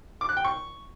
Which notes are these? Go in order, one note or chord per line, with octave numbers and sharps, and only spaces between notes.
D6
F#6
G5
C#6